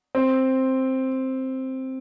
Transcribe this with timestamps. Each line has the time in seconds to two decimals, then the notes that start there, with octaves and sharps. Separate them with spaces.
0.15 C4